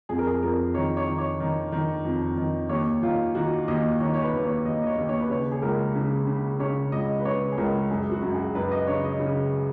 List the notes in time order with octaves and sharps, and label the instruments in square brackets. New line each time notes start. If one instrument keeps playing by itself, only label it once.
[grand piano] F2 G#4
A#4
G#4
F2 A#4
D#3 C#5
C#5
D#3
C#5
D#3
D#3
F2
D#3
D#2 C#5
D#3 F4
D#3 F#4
D#2 D#5
D#3 C#5
C#5
B4
D#2
C#5
D#2 D#5
D#5
C#5
D#2
C#5
B4
C#3 C#5
G#4
C#2 A#4
C#3
C#3
C#3 C#5
C#2 D#5
B4
C#3 C#5
G#4
C#2 A#4
F#2 G#4
F#4
F#2
G#4
F#2 B4
D#5
C#3 C#5
D#5
C#3